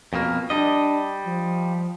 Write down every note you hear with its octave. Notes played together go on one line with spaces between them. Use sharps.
F2 B2 A#3
G3 D4 D#5
F3